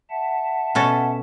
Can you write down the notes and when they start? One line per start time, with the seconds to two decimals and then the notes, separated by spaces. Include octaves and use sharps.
0.10 E5 F#5 A5
0.75 B2 C#4 A4